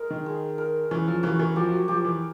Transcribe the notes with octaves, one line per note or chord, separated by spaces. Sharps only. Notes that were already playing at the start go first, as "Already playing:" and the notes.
Already playing: G#3 A#4
D#3
G#3
A#4
E3 C#4
F3
E3 F#4
E3
F3 G4
F3
F#3
F3 G4
E3